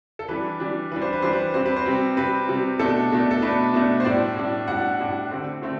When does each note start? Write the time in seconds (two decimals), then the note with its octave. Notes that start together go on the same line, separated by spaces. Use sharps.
0.19 A4
0.28 E3 G3 D4 B4
0.60 E3 G3 D4
0.91 E3 G3 D4 B4
1.02 C5
1.13 B4
1.22 E3 G3 D4 C5
1.33 B4
1.54 C3 G3 C4 C5
1.65 B4
1.76 C5
1.85 C3 G3 C4
2.17 C3 G3 C4 B4
2.48 C3 G3 C4
2.79 B2 A3 D4 A4
3.11 B2 A3 D4
3.31 A4
3.42 B2 A3 D4 B4
3.73 B2 A3 D4
4.00 C5
4.05 A2 G3 D4 D5
4.36 A2 G3 D4
4.68 A2 G3 D4 F#5
4.99 A2 G3 D4
5.31 D3 A3 C4
5.62 D3 A3 C4